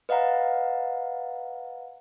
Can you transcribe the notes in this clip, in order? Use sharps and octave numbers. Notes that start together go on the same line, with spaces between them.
B4 D#5 F5 F#5 A#5